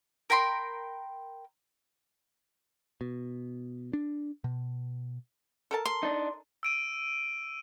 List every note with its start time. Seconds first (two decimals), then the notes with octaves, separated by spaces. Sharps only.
0.30 A#4 G5 B5 C6
3.01 B2
3.93 D4
4.44 B2
5.71 A4 A#4 A5
5.85 C6
6.03 D4 D#4
6.63 E6 D7 D#7